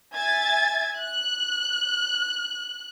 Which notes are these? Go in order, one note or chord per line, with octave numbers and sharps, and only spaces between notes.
E5 G#5 G#6 A6
F#6